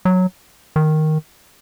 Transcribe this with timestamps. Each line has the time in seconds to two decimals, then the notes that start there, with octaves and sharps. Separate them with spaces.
0.05 F#3
0.76 D#3